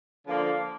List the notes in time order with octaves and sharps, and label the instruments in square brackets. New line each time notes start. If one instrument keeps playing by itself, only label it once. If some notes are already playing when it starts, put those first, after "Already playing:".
[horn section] D3 F3 A#3